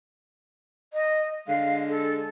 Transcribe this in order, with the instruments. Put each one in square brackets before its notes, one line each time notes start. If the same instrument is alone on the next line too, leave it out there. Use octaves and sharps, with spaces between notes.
[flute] D#5
[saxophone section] D3 G#3 [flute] F5
[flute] A4